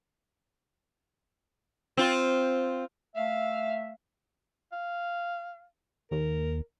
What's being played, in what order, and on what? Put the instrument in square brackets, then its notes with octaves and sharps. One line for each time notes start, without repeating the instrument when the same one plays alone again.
[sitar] C4 F4
[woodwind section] A3 E5 [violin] F5
[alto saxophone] F5
[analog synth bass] D#2 [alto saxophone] A#4